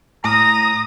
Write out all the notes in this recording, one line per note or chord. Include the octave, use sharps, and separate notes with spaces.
A2 A#5 D#6 A#6